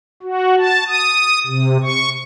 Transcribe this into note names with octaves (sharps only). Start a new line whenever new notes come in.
F#4
A5
D#6
C3
C#6